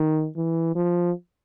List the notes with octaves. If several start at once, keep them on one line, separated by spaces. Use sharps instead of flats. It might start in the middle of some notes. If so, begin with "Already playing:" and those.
Already playing: D#3
E3
F3